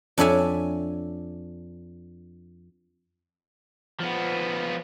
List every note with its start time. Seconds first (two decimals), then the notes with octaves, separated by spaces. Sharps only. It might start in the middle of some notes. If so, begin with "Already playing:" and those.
0.18 F2 D4 C#5 E5 G#5
4.00 F3 B3